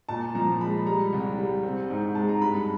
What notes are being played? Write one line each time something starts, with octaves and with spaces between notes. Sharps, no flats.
A#2 A5
F3 A#5
G#3 B5
G3 A#5
C2
G3
C4
G#2
G#3 A5
A#5
G2 B5